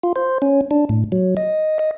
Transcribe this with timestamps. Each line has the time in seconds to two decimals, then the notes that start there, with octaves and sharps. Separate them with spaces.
0.03 F4
0.16 C5
0.42 C#4
0.71 D4
0.89 A2
1.12 F#3
1.37 D#5
1.79 D#5